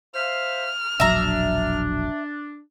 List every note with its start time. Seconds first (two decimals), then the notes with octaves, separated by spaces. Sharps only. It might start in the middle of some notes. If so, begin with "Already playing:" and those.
0.15 C5 E5 F5 F6
1.00 E1 A#1 F#3 D4 E5 A#5